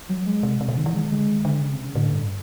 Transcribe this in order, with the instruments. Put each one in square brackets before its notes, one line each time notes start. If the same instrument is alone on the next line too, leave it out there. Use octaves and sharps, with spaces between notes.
[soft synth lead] F#3
G#3
[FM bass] C3
C3
B2
D#3
E3
[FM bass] D#3 [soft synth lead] G#3
[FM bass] D3 [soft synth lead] G#3
[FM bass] D#3
D3
C#3
[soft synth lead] C3
C#3
[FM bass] A2 [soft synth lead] D3
[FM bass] G2